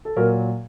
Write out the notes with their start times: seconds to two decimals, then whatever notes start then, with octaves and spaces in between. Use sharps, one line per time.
0.05 A4
0.16 A#2 F#3 A#4